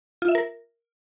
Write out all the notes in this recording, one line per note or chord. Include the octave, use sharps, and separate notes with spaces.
F4
E5
A#4